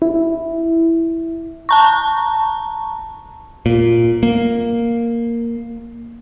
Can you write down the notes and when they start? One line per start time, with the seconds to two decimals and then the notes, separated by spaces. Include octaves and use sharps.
0.02 E4
1.69 A5 A#5 C#6
3.66 A#2
4.23 A#3